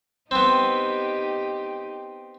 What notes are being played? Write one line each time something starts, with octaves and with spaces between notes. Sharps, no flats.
B3 C4 D#4 G4